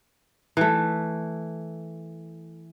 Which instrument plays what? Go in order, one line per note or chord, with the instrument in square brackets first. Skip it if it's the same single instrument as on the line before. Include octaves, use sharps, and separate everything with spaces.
[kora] E3 A3